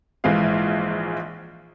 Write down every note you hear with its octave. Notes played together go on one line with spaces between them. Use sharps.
A#1 G#2 E3 G#3 G#4 F5